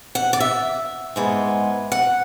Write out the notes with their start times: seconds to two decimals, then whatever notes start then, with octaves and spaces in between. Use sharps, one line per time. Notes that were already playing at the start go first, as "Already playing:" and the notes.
0.15 F#5
0.33 D5
0.40 E5
1.16 G#2 G#3 B3
1.92 F#5